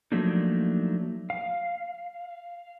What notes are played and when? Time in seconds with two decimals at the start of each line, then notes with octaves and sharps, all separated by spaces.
0.12 F3 F#3 A3 A#3 D4 D#4
1.30 F5